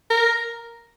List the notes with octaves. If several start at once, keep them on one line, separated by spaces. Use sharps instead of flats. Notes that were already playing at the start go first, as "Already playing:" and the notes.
A#4